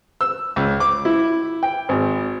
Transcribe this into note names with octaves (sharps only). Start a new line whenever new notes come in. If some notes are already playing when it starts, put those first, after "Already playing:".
E6
C#2
D6
E4
G5
G#1